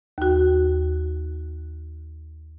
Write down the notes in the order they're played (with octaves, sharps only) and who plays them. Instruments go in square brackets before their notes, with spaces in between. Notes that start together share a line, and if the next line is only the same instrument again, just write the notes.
[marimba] D#2 F#4